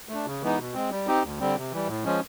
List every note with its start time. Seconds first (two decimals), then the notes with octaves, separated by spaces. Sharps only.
0.09 A3 D4
0.26 C#3
0.42 E3 G#3 B3 D#4
0.58 B2
0.74 G#3 C4
0.91 G3
1.07 C4 D#4 G4
1.23 D2
1.40 D3 G3 C4
1.56 C3
1.72 E3 G3
1.88 A2
2.04 F3 G#3 C#4